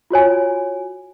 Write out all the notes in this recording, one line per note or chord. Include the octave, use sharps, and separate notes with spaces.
F4 F#4 C#5 G#5